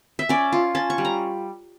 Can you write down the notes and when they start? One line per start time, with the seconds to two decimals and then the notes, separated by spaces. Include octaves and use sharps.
0.19 E5
0.29 C#4 D5
0.52 F4
0.75 C#4 A5
0.90 C#6
0.98 G3
1.05 A#5